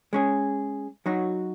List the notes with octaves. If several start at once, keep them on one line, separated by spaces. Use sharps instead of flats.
G#3 C#4 G#4
F#3 D#4 F#4